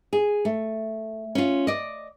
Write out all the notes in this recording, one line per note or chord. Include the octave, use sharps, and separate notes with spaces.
G#4
A3
C#4 F4
D5 D#5